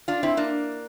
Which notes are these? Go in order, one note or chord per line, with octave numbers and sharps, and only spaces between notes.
D4 F4
C4 E4
A#3 D4